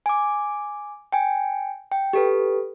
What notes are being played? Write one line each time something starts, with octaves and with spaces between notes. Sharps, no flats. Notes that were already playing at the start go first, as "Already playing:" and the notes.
G#5 D6
G5 G#5
G5
G4 A4 B4